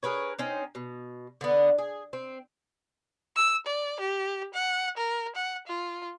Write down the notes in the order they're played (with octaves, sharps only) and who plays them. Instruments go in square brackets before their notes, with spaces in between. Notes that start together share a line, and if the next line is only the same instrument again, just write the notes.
[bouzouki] G#4 A#4 B4 C#5
C4 C#4 D#4
B2
D3 B3
G#4
C4
[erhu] E6
D5
G4
F#5
A#4
F#5
F4